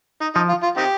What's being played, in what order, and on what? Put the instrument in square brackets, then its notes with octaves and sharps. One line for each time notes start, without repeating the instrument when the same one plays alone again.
[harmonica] D#4
[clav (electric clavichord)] F3 [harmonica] D#4
[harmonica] F4
F4
C4 D#4 G4